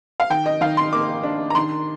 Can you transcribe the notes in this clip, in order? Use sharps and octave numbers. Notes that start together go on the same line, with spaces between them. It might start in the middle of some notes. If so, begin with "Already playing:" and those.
F5
D#3 G5
D#5
D#3 F5
C6
A#3 D6
D4
A#5
D#3 C6